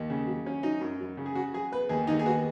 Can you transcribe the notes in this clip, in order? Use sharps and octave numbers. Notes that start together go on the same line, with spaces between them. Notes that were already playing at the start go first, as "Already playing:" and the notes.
Already playing: D#2
C#3
F#3
C#4
F#3 D#4
F#2
F#3
C#3
G#4
C#3 F#4
F#3 G#4
B3 B4
D#2 G#4
D#2 D#4
G#4
B3 F#4